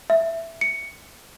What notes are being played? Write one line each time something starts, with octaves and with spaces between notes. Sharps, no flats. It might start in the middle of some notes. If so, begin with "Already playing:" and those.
E5
C#7